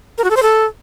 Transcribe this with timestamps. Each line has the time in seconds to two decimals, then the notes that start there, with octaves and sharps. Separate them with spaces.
0.18 A#4
0.24 F#4
0.30 A4
0.36 C5
0.43 A4